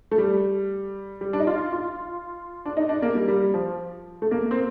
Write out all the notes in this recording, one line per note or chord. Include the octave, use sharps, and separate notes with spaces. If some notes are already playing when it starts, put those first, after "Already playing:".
A3
G3
G3
D4
D#4
F4
F4
D4
D#4
D4
A#3
G3
G3
F3
A3
A#3
C4